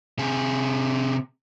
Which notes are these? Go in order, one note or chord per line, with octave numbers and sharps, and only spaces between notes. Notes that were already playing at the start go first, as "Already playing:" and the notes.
C3 G#4